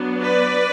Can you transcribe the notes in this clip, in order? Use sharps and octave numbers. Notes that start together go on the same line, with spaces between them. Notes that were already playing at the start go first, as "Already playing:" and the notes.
Already playing: F#3 B3 D4
B4 D5